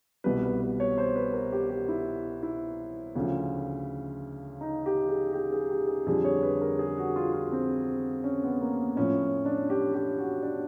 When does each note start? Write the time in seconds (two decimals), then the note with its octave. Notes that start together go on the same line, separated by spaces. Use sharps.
0.24 C2 B2 G3 B4
0.43 B4
0.61 B4
0.80 C#5
0.98 C5
1.16 B4
1.33 A#4
1.52 G4
1.70 G4
1.89 E4
2.43 E4
3.16 D2 C#3 F3
4.61 D#4
4.86 G4
5.09 G#4
5.33 G4
5.52 G#4
5.70 G4
5.88 G#4
6.06 F2 D3 G3 G#4
6.25 C#5
6.43 B4
6.61 A#4
6.79 G#4
6.98 F#4
7.16 F4
7.33 F4
7.52 C4
8.24 C#4
8.43 B3
8.61 A#3
8.97 A2 F3 C#4
9.45 D4
9.70 G4
9.94 G4
10.19 F#4
10.43 D4